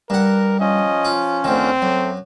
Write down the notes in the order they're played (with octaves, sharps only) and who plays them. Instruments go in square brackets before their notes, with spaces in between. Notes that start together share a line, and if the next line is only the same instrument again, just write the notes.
[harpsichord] G2 F#5 [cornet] A#4
[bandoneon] F3 C#4 [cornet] D#5
[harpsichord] F4
[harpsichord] D2 D#3 [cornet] C4
[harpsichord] F#2 [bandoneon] A3